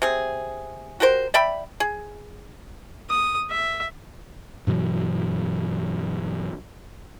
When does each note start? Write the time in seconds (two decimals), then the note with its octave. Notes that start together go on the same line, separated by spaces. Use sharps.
0.02 C3 G#4
1.00 F#4 G4 A#4 C5
1.34 D5 E5 G5 B5
1.80 G#4
3.10 D#6
3.50 E5
4.67 G2 B2 E3 F#3